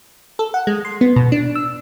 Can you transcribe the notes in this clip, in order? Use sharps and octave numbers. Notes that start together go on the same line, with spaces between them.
A4
F#5
G#3
C6
B3
B2
D4
E6